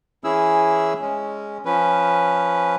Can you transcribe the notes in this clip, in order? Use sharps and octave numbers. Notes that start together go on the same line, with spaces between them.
E3 C#4 E4 G#4 E6
G#3 C#4
F3 C#4 B4